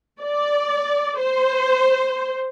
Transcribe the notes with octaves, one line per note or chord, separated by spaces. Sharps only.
D5
C5